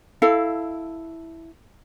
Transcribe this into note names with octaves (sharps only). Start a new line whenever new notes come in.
E4 A4 F5